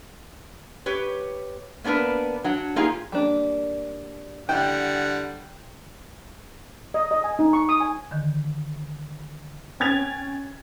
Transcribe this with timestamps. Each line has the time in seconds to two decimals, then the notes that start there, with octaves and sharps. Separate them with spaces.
0.86 G4 B4 C#5
1.84 A#3 B3 D4 A#4 B4
2.44 F#3 D4 F#5
2.76 A#3 D#4 F4 G4 G#4
3.12 G3 A#3 D4
4.49 D3 G3 E4 F#5 G5
6.94 D#5
7.11 D#5
7.24 G#5
7.39 D#4
7.53 C#6
7.69 D#6
7.80 G#5
8.11 D3 D#3
9.80 C#4 G5 G#6 A6 F7